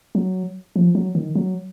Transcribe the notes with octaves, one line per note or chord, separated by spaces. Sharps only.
F#3
F3
F#3
D#3
F#3